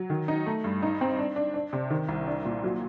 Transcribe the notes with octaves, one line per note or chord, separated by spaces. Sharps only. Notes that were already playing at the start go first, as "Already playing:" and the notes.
Already playing: F#3
D#3
D#4
A3
G2
D#4
C4
D4
D4
D4
C3
D#3
C2
D4
A#2
F#3